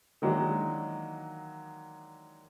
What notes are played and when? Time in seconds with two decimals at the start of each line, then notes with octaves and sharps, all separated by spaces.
0.22 D#3 E3 F#3 G#3 A#3 D4